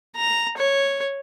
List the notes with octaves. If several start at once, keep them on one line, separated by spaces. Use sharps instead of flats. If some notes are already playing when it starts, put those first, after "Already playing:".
A#5
C#5